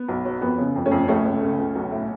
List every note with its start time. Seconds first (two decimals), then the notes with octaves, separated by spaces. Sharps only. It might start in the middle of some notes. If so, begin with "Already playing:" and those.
Already playing: B3
0.09 B1
0.25 F#3
0.41 F2 B3
0.59 C#3
0.76 F2
0.86 A3 C#4
0.91 F2
1.08 C#2 A3 C#4
1.25 C#2
1.42 C#3
1.58 C#2
1.75 B1
1.92 A2